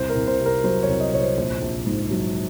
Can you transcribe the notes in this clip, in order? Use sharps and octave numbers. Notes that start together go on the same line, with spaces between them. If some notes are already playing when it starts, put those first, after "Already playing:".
Already playing: C2 C5
A#4
C2
C5
C3
A#4
F#3 C5
C#5
C2
D#5
C2 C#5
C5
A#1 C5
A#1
G#2
F#3